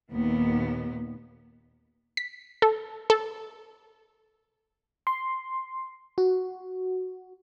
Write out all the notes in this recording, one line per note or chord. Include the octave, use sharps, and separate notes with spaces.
D#2 A#2 B3
B6
A4
A4
C6
F#4